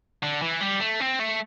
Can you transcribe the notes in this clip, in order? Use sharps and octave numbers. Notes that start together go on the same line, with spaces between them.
D3
E3
G3
A3
C4
A3